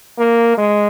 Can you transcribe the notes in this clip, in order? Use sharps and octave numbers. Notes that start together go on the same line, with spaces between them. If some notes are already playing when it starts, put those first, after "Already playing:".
A#3
G#3